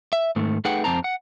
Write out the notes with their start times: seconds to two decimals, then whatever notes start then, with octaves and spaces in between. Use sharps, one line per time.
0.13 E5
0.36 G#2 D#3 A3
0.65 A3 D#4 G#4 B4 F#5 G5
0.84 F2 C4 A5 A#5
1.04 F#5